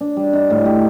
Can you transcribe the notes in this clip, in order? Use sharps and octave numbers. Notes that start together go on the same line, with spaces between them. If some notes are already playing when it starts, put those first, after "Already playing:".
D4
G3
D#4
A2
G4